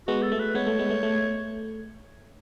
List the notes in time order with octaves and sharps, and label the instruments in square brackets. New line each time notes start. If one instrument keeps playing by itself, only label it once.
[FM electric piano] G#3 B3 [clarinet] F#4
[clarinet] A4
[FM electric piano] A3
[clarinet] B4
[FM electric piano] G#3 B3 [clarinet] C#5
[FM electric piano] A3
G#3 B3
A3
A3